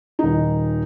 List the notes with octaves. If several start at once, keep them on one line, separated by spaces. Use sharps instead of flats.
D#1 D#4